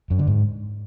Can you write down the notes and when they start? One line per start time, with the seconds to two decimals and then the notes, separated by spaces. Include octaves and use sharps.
0.10 F#2
0.19 D3
0.28 G#2